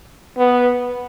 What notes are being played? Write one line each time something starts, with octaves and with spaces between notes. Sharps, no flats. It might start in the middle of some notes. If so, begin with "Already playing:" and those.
B3